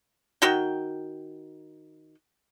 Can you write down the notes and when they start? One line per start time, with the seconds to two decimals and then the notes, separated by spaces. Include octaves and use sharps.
0.42 D#3 F#4 G5